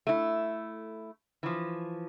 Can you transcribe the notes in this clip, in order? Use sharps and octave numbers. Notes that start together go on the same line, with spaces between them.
A3 E4
E3 F3